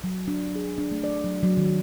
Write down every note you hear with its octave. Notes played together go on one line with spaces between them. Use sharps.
F#3
D4
G#4
D4
A3
D5
F#3
F#3
D#3